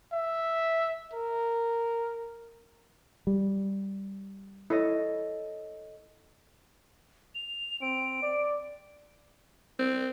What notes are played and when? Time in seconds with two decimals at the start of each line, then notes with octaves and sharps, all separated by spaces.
0.12 E5
1.13 A#4
3.27 G3
4.70 E4 A4 C#5 D#5
7.35 F7
7.81 C4 D7
8.23 D5
9.80 C4